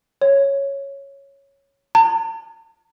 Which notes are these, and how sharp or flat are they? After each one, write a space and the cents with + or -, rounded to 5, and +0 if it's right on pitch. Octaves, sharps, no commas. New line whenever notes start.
C#5 -5
A5 +45